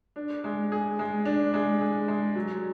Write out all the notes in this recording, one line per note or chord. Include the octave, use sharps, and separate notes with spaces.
D4
G#3
G#4
G#3
D4
G#3
G#4
G#3
F#3